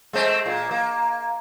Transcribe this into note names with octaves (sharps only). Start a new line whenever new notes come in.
G#3 A3 C4
A#2
A#3